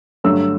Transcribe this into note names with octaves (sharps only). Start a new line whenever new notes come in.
G2 D3 F#3 A3 E6